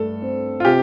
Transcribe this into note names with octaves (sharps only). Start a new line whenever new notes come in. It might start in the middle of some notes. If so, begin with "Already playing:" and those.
Already playing: G2 A3 A4
C4
F4
C3 G4